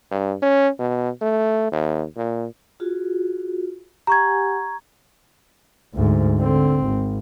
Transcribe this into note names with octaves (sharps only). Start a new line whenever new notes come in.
G2
C#4
B2
A3
D#2
A#2
F4 F#4 G#4
G4 F#5 G#5 A#5 C#6 G#6
D2 G#2
D3 C4
G#1